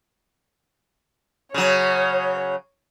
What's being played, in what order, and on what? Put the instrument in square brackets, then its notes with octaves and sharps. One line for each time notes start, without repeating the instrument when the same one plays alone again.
[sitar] C#3 F#3 [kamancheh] C#5